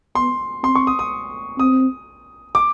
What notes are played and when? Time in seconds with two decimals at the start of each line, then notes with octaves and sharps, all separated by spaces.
0.15 B3 C6
0.63 C4 C6
0.75 C#6
0.87 D#6
0.99 D#6
1.58 C4 D#6
2.55 D6